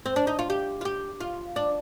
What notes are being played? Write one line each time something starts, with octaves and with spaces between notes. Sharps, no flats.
C4
D4
D#4
F4
G4
F4
G4
F4
D4